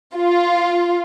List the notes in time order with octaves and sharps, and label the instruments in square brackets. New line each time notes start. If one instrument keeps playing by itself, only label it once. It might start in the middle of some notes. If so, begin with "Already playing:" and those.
[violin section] F4